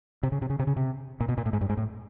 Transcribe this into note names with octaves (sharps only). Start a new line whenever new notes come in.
C3
C#3
C3
C#3
C3
C#3
C3
A#2
B2
A#2
A2
G#2
G2
G#2
A2